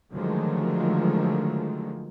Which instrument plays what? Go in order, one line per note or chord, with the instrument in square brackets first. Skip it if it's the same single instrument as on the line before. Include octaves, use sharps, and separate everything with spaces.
[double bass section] D3 D#3 F3 F#3 G#3 A3